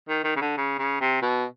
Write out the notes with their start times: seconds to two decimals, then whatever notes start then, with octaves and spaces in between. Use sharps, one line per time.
0.09 D#3
0.24 D#3
0.36 C#3
0.41 D3
0.57 C#3
0.79 C#3
1.01 C3
1.22 B2